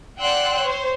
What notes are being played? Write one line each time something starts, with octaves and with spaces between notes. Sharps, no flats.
D5 F#5 G5 C6 E6 F#6
C5 C#5